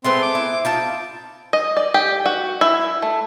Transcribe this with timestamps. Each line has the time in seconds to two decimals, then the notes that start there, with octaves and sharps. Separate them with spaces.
0.04 G#3 A3 B3 C4 C6
0.22 D6
0.35 E4
0.65 D#4 F4 A5
1.53 D#5
1.77 D5
1.94 G4
2.26 F#4
2.61 E4
3.02 A3